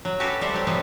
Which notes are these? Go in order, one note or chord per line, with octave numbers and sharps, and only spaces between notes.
F#3
C#4 F#4 G4 A4 B4 F5
G3 A4 C5 E5
F#3 G4
C3 F3 F#3 B3 B4 C5